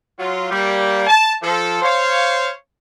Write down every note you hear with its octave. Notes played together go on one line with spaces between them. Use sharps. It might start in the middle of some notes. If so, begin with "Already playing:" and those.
F#3 F4
G3 A#3
A5
F3 A4
C5 C#5 F5